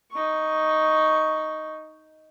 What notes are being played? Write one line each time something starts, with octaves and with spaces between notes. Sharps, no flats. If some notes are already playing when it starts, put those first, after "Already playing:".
D#4 C#6